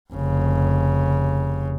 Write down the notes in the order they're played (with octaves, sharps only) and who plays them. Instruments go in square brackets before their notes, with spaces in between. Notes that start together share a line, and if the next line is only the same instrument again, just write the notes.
[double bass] F1 C#3